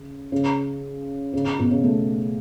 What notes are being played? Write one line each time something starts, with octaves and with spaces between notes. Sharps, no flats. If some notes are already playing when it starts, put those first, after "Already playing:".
Already playing: C#3
C#3
C#3
C#3
B2
C#3
A3